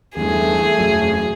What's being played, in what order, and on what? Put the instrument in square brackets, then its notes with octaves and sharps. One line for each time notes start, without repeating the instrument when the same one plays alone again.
[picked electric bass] E2 G2 [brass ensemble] A3 [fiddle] G#4
[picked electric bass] E1 F#2 F#3